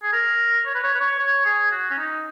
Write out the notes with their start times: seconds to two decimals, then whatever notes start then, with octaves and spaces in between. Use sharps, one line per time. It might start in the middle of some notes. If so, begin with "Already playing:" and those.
0.03 G#4
0.13 A#4
0.66 C#5
0.75 B4
0.84 C#5
0.94 B4
1.01 C#5
1.20 C#5
1.46 G#4
1.72 F#4
1.91 C#4
1.98 D#4